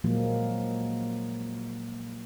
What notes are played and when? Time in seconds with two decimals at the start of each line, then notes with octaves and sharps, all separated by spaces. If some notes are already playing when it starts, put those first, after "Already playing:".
0.04 A#2 F3 F#3 G#3 A#3